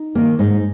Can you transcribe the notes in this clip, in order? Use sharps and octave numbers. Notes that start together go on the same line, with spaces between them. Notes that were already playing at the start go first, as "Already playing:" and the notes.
Already playing: D#4
D#3 A#3
G#2 D#4